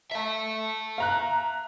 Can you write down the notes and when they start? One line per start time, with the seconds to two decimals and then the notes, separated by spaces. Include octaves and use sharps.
0.11 E5 A5
0.98 F5 A#5 F#6